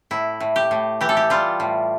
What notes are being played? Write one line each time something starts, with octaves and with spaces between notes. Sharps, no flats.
A2 E4
A2
G4
A2
E3 G4
A4
G4
G3 F4
A2